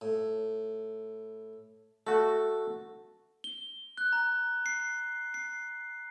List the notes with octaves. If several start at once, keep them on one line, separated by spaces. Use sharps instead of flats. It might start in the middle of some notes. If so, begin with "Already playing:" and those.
A2
A3 F#4 A4
G7
F#6
A#5
C7
C7